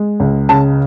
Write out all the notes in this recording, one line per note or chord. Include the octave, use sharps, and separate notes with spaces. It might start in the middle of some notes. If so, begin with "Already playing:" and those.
Already playing: G#3
C#2
C#3 A5